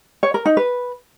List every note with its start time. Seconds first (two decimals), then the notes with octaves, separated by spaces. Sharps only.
0.23 C#5
0.34 A#4
0.46 D#4
0.57 B4